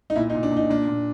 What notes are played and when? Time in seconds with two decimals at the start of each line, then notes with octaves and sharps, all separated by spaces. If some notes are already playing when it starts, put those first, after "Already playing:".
0.10 D#4
0.16 A#2 E4
0.30 D#4
0.35 A#2
0.43 D4
0.51 A#2
0.57 D#4
0.70 A#2 D4
0.88 A#2